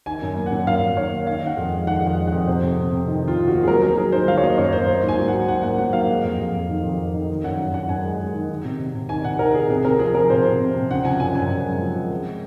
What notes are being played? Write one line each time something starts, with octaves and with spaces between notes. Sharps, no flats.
D#3 G#5
F#2
A#3
F#5
F#2
F#2 F5
F#2
D#3 C#5
A#3
D#3 F5
D#3
F#5
F2
G#3
D#3 F#5
F2
F#5
G#3
F2 F#5
C3 C5
C3
C3
C3
D#3
D#3
F4
C3
A#3 F#4
G#4
F#3 A#4
F#3 A#4
F#3 G#4
D#3 C5
F#3 F5
C#5
A#3 D#5
F#2 C#5
F#2 C5
A#3 C5
G#2
G#5
F#3
F#5
G#2
G#2 F#5
A#3 F#5
F#3 F#5
A#3 F5
G#3
F2
F2
F2
D#3
F2
F2
D#3
D#3
F#2 F#5
F#2
F#2 F#5
F#2 G#5
G#3
G#3
D#3
D#3
C3
C3
C3
D#3 G#5
C3 F#5
D#3 A#4
C3 G#4
C3 G#4
C3 A#4
F3 G#4
F3 A#4
C3 C5
C3
C3
C3
C#3 F#5
F3 G#5
F#2 G#5
F#2 G#5
F#2
G#3
F3
G#3
G#3